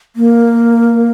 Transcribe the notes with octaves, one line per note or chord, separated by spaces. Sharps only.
A#3